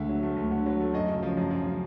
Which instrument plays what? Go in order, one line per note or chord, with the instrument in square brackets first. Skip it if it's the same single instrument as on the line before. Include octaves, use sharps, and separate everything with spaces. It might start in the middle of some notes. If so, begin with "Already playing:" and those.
Already playing: [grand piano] D2 D3 G#3 E5
F#3
A3
D2
D3
F#3
A3
F#2 D#5
C#3
F3
F#2
F#2
C#3